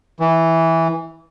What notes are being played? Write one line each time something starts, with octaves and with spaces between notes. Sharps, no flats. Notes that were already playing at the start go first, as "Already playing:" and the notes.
E3